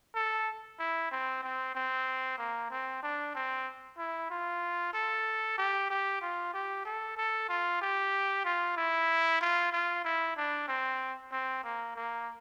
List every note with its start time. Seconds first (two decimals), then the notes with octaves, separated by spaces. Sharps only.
0.15 A4
0.80 E4
1.12 C4
1.43 C4
1.75 C4
2.38 A#3
2.71 C4
3.03 D4
3.35 C4
3.98 E4
4.30 F4
4.94 A4
5.58 G4
5.91 G4
6.22 F4
6.54 G4
6.85 A4
7.17 A4
7.49 F4
7.82 G4
8.45 F4
8.77 E4
9.41 F4
9.73 F4
10.05 E4
10.37 D4
10.68 C4
11.32 C4
11.65 A#3
11.96 A#3